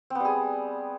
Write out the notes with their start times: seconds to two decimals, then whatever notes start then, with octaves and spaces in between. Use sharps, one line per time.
0.10 C4
0.15 B3
0.20 G3
0.25 G#4